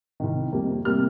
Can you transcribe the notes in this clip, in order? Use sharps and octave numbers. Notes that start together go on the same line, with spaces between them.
C2 C3 D#3
F2 C3 G3 A#3
C3 G3 A#3 F6